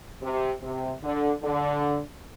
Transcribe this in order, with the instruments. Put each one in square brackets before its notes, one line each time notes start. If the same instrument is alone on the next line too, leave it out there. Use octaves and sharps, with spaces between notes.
[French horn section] C3
C3
D3
D3